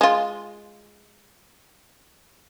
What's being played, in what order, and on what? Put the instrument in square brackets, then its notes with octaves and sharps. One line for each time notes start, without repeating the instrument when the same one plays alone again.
[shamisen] G#3 F4